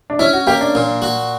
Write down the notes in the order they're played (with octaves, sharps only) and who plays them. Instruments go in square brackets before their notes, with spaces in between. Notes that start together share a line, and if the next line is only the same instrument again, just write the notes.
[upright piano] D4
[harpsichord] C#4 [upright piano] E4
[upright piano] F#4
[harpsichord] A#3 [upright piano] G4
[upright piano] D4
[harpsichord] A#2
F#4